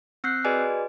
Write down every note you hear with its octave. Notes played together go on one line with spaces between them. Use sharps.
C4 E6 F#6 G6 C7
F#4 G#4 B4 D5 D#5 G#5